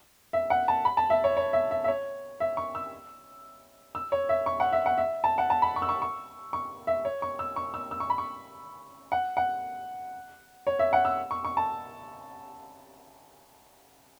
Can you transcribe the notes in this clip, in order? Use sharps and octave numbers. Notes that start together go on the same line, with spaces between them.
E5
F#5
A5
B5
A5
E5
C#5
C#5
E5
E5
E5
C#5
E5
C#6
E6
E6
C#5
E5
C#6
F#5
E5
F#5
E5
A5
F#5
A5
B5
C#6
E6
C#6
C#6
C#6
E5
C#5
C#6
E6
C#6
E6
E6
C#6
B5
C#6
F#5
F#5
C#5
E5
F#5
E6
C#6
C#6
A5